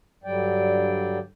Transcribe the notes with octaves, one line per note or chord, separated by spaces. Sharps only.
G2 D3 F#3 G3 D5 G5